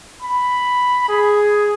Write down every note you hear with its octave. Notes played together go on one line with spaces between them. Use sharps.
B5
G#4